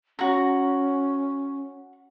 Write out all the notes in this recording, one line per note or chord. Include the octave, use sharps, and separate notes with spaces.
C#4 F#4 A#5